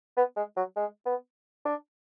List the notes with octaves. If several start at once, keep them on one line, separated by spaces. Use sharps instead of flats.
B3
G#3
F#3
G#3
B3
D4